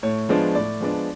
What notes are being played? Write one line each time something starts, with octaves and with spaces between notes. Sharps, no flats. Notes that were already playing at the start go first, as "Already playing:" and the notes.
A2 C#5
F3 G#3 B3 D4
A2 D5
F3 G#3 B3 D4